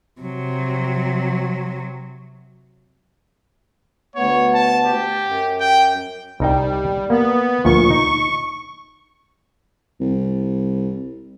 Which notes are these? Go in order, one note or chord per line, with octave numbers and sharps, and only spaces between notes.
C3 F#3
D2 B3 C#5
A5
G4
F#2
G5
C2 G3 D#4 G5
A#3 B3
D2 A#2 F3 C#6
D#4
C2